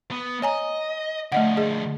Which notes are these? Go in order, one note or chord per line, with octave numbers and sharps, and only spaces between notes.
B3
C#5 D#5 G#5 A#5
D3 F3 A3 D#5 F#5
G#4 D#5